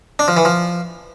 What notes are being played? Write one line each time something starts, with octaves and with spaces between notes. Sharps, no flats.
D4
F3
E3
F3